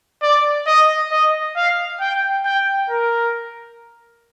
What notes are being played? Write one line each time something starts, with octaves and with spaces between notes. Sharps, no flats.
D5
D#5
D#5
F5
G5
G5
A#4